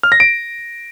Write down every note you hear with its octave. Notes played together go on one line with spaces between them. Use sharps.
F6
A#6
D7